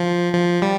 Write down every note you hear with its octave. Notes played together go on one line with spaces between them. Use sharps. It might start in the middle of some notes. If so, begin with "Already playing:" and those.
Already playing: F3
F3
G3